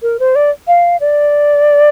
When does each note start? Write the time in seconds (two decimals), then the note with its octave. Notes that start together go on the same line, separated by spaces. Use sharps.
0.02 A#4
0.20 C5
0.36 D5
0.68 F5
1.00 D5